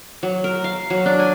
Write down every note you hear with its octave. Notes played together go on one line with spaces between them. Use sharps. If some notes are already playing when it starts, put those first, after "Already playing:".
F#3
A#4
F5
F#3
D4
G#5